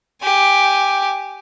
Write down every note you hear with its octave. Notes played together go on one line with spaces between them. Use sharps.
G4 G#5